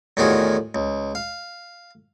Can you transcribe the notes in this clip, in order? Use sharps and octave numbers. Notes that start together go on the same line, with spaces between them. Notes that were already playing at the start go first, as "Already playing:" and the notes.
E2 A2 D#3 F4 F#4 G#4
C#2
F5